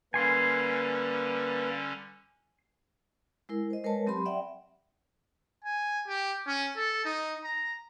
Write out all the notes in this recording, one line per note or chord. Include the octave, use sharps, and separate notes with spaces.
D3 G3 A#3 C#4 B4 G#5 C6
G#3 E4 A#4
C5 D#5
G#3 A#4 B4 C#5 A5
F#3 C4 G4 B5 C6
D5 E5 F#5 G5
G#5
G4
C#4
A4
D#4
A#5